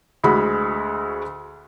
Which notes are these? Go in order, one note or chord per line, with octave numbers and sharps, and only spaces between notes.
D2 G#3 F#4 B5